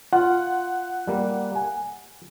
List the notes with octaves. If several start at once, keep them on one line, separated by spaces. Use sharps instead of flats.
F4 F#5
G3 A#3
G#5